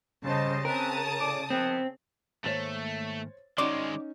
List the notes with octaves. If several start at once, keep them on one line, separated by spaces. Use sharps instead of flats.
C#3 G3 C5 D#5 A5
C#3 C4 C#4 A#4 B4 A5 D#6
A2 D5 D6
D#3 F3 B3 C4
G#2 D#3 A3 A#3 C5 C#5 A6
D#3 G#3 C#4 D#4 F#4 D5 C6